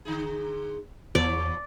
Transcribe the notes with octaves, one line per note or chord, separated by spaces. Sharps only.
D3 D#4 G#4
E2 A#2 F3 C#5 D5